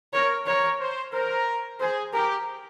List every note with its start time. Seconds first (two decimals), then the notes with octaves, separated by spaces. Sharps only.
0.13 A#4 C#5
0.46 A#4 C#5
0.80 C5
1.13 A#4 C5
1.80 G#4 C5
2.13 G4 A#4